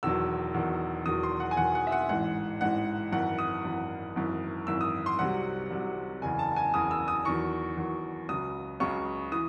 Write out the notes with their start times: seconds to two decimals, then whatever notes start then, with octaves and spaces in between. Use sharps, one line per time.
0.03 E1 E2 D#3 F#3 E6
0.54 E1 E2 D#3 F#3
1.06 E1 E2 D#3 F#3 D#6
1.23 C6
1.40 F#5
1.51 G#5
1.57 E1 E2 D#3 F#3 F#5
1.75 F#5
1.87 E5
1.92 F#5
2.09 A1 G#2 E3 F#5
2.61 A1 G#2 E3 F#5
3.12 G#1 F#2 E3 F#5
3.39 D#6
3.64 G#1 F#2 E3
4.16 G#1 F#2 E3
4.67 G#1 F#2 E3 E6
4.81 D#6
5.06 C6
5.19 C2 C3 F#3 F#5
5.71 C2 C3 F#3
6.22 F#1 E2 C#3 G#5
6.39 A5
6.56 G#5
6.74 F#1 E2 C#3 D#6
6.91 E6
7.08 D#6
7.25 E2 D#3 F#3 C#6
7.77 E2 D#3 F#3
8.29 C#2 C#3 F#3 D#6
8.80 C#2 C#3 F#3 C#6
9.32 E3 D#6